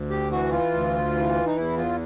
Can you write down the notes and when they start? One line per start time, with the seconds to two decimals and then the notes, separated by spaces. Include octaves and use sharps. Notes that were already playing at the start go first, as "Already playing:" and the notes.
Already playing: D2
0.10 G4
0.31 E3 F#4
0.51 F4
0.73 D2
1.15 E3
1.46 D#4
1.56 E2 E4
1.77 F4